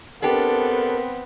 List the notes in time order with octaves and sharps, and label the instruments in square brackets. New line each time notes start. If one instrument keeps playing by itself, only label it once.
[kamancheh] B3 C4 [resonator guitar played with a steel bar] D4 G4 [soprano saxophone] A4 [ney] A#4